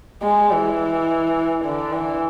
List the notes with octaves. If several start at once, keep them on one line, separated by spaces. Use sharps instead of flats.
G#3
E3
D3
E3